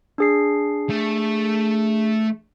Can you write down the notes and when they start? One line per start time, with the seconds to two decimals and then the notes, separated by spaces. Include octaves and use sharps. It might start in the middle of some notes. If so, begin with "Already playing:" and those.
0.18 D4 G#4 C7
0.90 A3